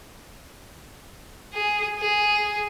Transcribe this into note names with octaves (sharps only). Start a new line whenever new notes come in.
G#4
G#4